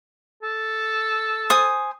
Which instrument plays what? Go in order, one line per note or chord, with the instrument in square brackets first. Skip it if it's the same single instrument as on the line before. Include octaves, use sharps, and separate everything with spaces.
[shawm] A4
[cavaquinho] C5 G#5 D#6